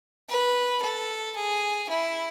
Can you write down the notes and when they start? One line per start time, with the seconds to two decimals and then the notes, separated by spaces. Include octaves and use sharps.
0.29 B4
0.82 A4
1.35 G#4
1.89 E4